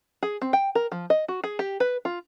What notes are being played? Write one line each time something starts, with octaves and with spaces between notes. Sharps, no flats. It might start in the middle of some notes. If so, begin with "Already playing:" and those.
G#4
C4
G5
A#4
F3
D#5
F#4
G#4
G4
B4
F4